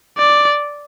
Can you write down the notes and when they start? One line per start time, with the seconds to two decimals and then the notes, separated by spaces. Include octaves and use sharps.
0.18 D5